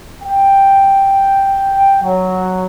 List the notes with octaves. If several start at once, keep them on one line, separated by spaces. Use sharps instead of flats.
G5
F#3